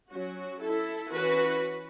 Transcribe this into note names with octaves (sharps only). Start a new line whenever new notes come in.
F#3 C#4 F#4
E4 A4
E3 C#4 F#4 B4